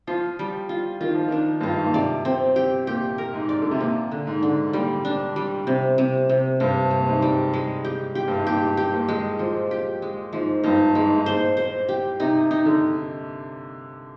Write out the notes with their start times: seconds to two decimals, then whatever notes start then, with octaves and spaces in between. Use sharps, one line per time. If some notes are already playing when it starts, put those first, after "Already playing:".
0.07 F3 F4
0.39 G3
0.69 F4
1.01 D#3 F4
1.15 F3
1.28 D#3 D4
1.61 G2 F4
1.71 G#2
1.83 A#2
1.94 C3 D5
2.25 C4
2.56 G4
2.87 A#2 G4
3.18 A#4
3.34 G#2
3.49 D5
3.62 D3
3.71 C3
3.81 A#2 A#3
4.11 D3
4.27 G#2
4.43 D3
4.73 A#2 G3
5.05 D4
5.36 G3
5.67 C3
5.98 C3
6.29 C3
6.60 G2 C3
6.91 C3
6.96 A#2
7.07 G#2
7.22 G3
7.54 G#3
7.85 G4
8.15 G4
8.28 G2
8.37 G#2
8.46 A#2 G4
8.77 G4
8.93 A#2
9.09 G#3
9.39 F3
9.71 G4
10.02 G#3
10.33 G#2 F3
10.64 G2 D#4
10.95 G#2 G#3
11.16 G#2
11.26 A#2 C5
11.57 C5
11.89 G4
12.20 C3 D#4
12.51 D#4
12.66 D3